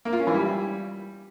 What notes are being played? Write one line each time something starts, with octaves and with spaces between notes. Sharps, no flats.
A#3
F4
C#4
E3
G3